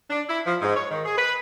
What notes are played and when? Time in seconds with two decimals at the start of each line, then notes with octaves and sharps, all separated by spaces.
0.10 D4
0.28 E4
0.45 F3
0.61 G#2
0.76 C#5
0.91 D#3
1.05 G#4
1.18 B4